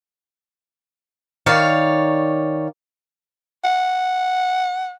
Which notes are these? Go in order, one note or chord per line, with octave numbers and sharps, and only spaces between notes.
D#3 C#5 D5 F5
F#5